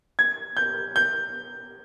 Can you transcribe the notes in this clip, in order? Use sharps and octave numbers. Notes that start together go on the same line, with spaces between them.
G#6
G6
G6